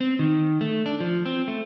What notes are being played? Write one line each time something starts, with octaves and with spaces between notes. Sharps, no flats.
C4
D#3
A3
D4
F3
C4
A3